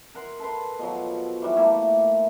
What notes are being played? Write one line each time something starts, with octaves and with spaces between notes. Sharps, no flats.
A#4 F#5 C6
A4 B4 C6
B2 F3 F#3
E3 F#3 G3 F#4
A3 A#3 E4 D5